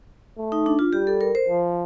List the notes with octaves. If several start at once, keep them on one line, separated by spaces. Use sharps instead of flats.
A3
D#4
D4
F4
G3 G4
A4
A#4
C5
F3